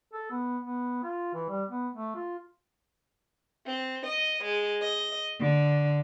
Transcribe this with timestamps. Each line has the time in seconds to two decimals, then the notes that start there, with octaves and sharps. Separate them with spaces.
0.13 A4
0.32 B3
0.63 B3
1.03 F4
1.34 E3
1.49 G3
1.69 B3
1.95 A3
2.16 F4
3.67 C4
4.06 D#5
4.43 G#3
4.82 D#5
5.38 D3